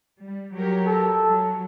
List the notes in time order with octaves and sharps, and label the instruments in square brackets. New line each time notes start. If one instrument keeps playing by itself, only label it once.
[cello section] G3
F#3 G4 A#4
[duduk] A4
[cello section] F#3